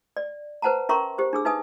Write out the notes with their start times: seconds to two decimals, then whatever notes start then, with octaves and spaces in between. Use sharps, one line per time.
0.17 D5
0.62 B4 C5 F#5 A5 A#5
0.89 C#4 A#4 E5 A#5 C6 C#6
1.18 G4 C5
1.33 D4 G#4 E6
1.45 D#4 B4 E5 G#5 D#6